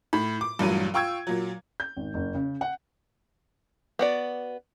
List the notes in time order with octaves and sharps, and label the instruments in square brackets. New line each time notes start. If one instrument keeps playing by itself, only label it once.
[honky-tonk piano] A2 B5
D6
A1 G2 A#2 F#3 D#7
F4 G5 C#6 E6 G#6
A#2 F#3
[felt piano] G6
G#1
F#1
C#3
F#5
[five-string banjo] B3 F#4 D5